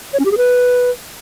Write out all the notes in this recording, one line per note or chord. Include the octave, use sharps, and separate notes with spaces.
C#5
C#4
G4
G#4
B4